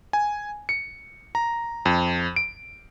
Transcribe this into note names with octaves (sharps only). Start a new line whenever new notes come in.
G#5
C#7
A#5
F2
D7